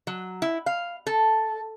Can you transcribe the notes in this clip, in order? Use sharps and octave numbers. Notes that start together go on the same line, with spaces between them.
F#3
E4
F5
A4